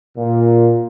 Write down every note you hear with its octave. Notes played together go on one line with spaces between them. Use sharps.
A#2